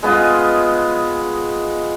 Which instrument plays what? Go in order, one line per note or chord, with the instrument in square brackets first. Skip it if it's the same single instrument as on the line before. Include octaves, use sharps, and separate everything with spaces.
[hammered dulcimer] G#3 B3 F4 D#5